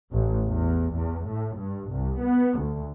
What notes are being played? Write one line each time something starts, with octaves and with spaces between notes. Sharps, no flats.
A1
E2
E2
A2
G2
C2
B3
D2